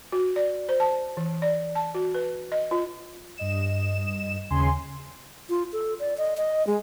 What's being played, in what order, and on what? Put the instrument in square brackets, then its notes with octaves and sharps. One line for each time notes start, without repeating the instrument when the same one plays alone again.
[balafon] F#4
D5
C5
A5
E3
D5
A5
F#4
B4
D#5
F4
[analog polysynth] G2 D#5 E7
D#2 C#3 G#5 C6
[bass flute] F4
A4
D5
D#5
D#5
G#3